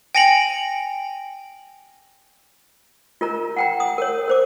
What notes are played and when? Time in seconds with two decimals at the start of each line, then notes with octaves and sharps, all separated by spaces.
0.15 G5 G#5 A#6 C#7 F7 F#7
3.21 F4 A#4 A#5
3.56 F#5 G5 A#5
3.80 D#6
3.98 A#4 C#5
4.28 A#4 C5 D6